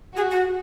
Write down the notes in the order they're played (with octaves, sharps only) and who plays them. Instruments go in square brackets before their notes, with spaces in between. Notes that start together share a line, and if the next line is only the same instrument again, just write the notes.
[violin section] F#4 [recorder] G#4
[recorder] F#4